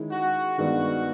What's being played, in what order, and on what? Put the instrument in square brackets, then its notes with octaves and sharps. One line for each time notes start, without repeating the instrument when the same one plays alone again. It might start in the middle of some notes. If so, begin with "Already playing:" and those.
Already playing: [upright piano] D#3 G#3 C#4 E4
[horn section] F#4
[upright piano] G2 D#3 G#3 B3 [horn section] F#4